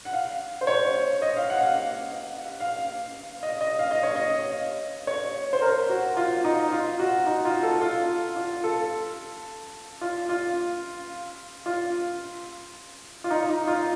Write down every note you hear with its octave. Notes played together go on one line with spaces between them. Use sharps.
F#5
F5
C5
C#5
D#5
F5
F#5
F5
F5
D#5
D#5
F5
D#5
C#5
D#5
C#5
C5
A#4
F#4
F4
D#4
F4
F#4
D#4
F4
A4
F4
F4
A4
F4
F4
F4
F4
D#4
D#4
F4